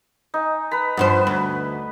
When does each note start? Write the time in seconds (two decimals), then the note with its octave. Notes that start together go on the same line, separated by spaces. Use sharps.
0.34 D#4 G#5
0.71 B4 A#5 B5
0.97 G2 F3 B3 B4 C5
1.27 D2